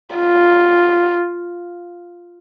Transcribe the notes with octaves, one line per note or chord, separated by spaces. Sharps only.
F4